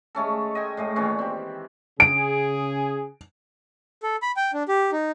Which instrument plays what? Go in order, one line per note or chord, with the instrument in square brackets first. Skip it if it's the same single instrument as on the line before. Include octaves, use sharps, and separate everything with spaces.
[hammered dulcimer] G#3 A3 C#4 A4
D#5 G5 G#5
A2 G#3 A3
A#2 D#3 E3 C#4
C4 G4
[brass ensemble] C#3 G#4 [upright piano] D7
[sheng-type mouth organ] A4
B5
G5
D4
G4
D#4